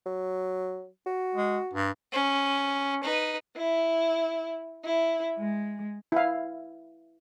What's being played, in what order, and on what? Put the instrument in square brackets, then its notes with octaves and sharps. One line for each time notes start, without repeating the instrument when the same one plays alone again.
[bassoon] F#3
F#4
[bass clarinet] G#3
G2
[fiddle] C#4
D#4 B4
[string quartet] E4
E4
G#3
[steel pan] E4 F5